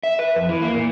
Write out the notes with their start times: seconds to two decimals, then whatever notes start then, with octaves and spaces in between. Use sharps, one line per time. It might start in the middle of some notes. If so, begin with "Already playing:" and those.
0.03 E5
0.19 B4
0.36 F2
0.49 E3
0.62 A#3
0.74 A#2